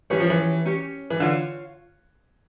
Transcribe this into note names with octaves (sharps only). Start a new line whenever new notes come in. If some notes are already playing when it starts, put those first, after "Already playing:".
E3 C#4 G4 C#5
F3
E3
C#4 G4 C#5
E3
D3 F4 C#5 F5